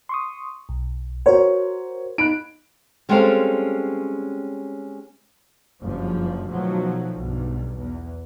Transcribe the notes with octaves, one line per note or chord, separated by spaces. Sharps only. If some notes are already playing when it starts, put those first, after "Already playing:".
C6 C#6 D#6
B1
F#4 A#4 C5 C#5
D#4 B5 F#6 D7
G3 G#3 C4 C#4 A4 F5
F#1 G2 F3
B2 D#3 F3 F#3 A3
B1 G2
E2